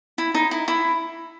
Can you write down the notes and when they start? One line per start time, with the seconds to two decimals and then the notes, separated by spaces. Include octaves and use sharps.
0.18 E4
0.34 D#4
0.51 E4
0.68 E4